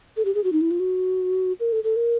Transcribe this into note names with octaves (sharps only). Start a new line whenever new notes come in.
A4
G4
G#4
F#4
D#4
E4
F4
F#4
A#4
A4
A4
A#4